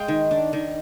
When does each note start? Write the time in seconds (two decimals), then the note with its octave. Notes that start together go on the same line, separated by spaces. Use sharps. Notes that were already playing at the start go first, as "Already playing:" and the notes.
Already playing: G#3 F5 G5
0.08 D#3
0.31 D4
0.53 D#3